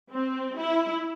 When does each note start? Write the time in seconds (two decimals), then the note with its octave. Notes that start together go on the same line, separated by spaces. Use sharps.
0.12 C4
0.58 E4